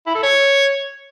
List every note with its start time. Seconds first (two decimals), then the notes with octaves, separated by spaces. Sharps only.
0.07 E4
0.15 A4
0.23 C#5